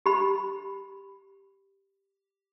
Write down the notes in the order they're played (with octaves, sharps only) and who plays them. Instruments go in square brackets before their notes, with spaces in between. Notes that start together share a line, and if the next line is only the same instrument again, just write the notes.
[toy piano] G4 B5